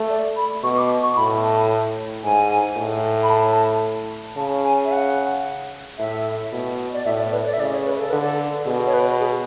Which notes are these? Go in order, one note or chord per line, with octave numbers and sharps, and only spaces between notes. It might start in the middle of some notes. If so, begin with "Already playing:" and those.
Already playing: A3
D5
B5
B2 C#6
D6
C#6
A2 B5
A5
G#2 G#5
A2
B5
A5
C#3 A5
G#5
E5
F#5
A2 E5
B2
D5
A2 E5
D5
B4
D5
E5
C#3 D5
C#5
B4
A4
D3 B4
A4
B2 G#4
C#5
B4
B4
G#4